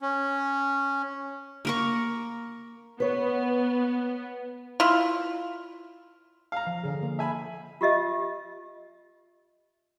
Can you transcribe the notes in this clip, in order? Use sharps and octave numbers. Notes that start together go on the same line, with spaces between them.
C#4
A#3 A#4 C#6
B3 B4 C#5
E4 F4
F5 A#5
F3
D3 G#4
A#3
E5 G#5 B5
F4 G4 D#5 E5